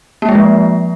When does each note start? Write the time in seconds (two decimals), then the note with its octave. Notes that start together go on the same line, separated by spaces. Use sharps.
0.22 A#3
0.29 G#3
0.35 F3